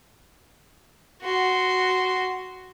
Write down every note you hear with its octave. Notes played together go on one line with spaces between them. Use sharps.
F#4 C6